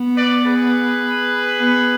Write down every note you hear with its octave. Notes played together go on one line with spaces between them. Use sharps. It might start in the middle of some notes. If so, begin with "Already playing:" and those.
Already playing: B3
B4 D5
G#4 B4
B3